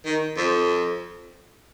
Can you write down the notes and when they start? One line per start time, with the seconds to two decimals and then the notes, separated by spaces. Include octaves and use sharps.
0.05 D#3
0.37 F2